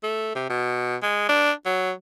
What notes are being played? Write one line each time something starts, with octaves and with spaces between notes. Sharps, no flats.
A3
C3
B2
G#3
D4
F#3